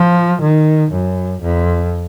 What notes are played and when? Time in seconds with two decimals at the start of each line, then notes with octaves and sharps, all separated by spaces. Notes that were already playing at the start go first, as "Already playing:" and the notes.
Already playing: F3
0.43 D#3
0.92 F#2
1.43 F2